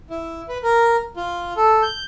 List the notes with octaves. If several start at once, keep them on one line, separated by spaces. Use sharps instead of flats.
E4
B4
A#4
F4
A4
G6